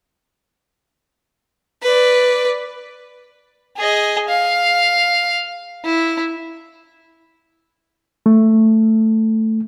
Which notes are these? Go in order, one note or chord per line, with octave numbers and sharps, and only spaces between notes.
B4 D5
G#4 D#5
F5
E4
A3